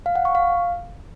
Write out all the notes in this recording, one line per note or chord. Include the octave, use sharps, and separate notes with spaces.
F5
F#5
C#6
F5